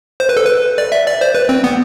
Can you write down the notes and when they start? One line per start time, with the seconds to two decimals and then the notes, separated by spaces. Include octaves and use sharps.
0.20 C5
0.29 B4
0.37 A4
0.46 B4
0.78 D5
0.92 E5
1.07 D5
1.21 C5
1.35 B4
1.49 C4
1.64 B3